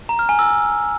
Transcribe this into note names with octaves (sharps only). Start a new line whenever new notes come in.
A#5
F6
G#5
E6